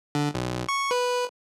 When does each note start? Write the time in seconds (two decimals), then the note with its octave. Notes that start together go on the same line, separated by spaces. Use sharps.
0.15 D3
0.34 B1
0.69 C#6
0.91 B4